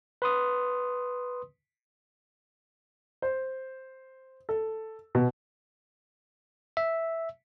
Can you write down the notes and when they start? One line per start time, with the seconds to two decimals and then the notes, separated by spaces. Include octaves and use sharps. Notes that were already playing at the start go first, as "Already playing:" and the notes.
0.22 B4 C6 D#6
3.22 C5
4.49 A4
5.15 B2
6.77 E5